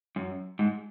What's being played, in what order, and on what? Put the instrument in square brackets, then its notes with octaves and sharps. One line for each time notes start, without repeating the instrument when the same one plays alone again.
[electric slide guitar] F#2
G#2